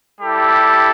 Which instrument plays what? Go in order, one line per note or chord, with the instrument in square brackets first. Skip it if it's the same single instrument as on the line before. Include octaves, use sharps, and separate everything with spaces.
[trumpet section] G3 E4 G4 A4